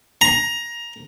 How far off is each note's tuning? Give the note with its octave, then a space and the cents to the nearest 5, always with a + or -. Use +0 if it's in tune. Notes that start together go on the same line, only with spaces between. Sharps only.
A#5 +15